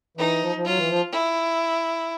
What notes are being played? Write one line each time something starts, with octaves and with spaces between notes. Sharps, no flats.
E3 D#4
F3
F3
F#3 F4
E3
F3
E4